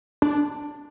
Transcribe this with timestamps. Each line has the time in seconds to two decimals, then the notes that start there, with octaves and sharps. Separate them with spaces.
0.22 D4